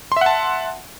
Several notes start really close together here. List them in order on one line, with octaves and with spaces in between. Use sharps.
C6 E5 F#5 A5